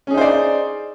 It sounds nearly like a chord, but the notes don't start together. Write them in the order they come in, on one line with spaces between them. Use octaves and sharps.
C#4 G#4 D#4 C5 D5